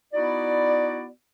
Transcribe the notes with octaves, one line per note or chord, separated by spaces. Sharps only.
B3 D#4 E4 F#4 D5